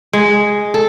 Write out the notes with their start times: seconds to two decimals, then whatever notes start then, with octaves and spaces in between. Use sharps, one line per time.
0.13 G#3
0.74 A4